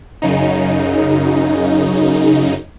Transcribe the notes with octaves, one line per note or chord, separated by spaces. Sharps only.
F#2 C#3 D#4